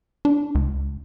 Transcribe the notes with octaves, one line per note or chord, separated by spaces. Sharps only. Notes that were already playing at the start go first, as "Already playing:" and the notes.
D4
C#2